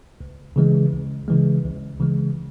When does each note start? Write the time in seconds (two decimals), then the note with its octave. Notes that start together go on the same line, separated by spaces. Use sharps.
0.21 C#2
0.56 C#3 E3 G#3
0.92 C#2
1.28 C#3 E3 G#3
1.64 C#2
2.00 C#3 E3 G#3